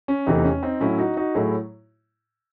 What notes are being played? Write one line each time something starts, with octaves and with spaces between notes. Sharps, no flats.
C#4
E2 C3 E3 A3 C4 D#4
C#4
C4 D#4
A2 F#3 A3 C#4 E4
D#4 F#4
D#4 F#4
A2 F#3 A3 E4 G#4